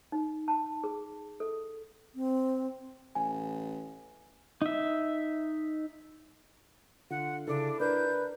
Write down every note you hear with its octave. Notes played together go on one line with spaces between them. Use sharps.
D#4
A5
G#4
A4
C4
A1 G#5
D#4 E5
D3 F4 F#5
C#3 D4 E4 A4
D4 A#4 B4 G6